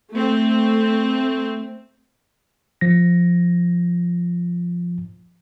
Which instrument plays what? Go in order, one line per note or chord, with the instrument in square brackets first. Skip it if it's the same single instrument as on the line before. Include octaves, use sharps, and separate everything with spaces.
[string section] A3 C4
[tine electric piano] F3 A#6